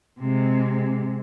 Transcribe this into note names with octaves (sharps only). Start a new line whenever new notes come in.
C3 G#3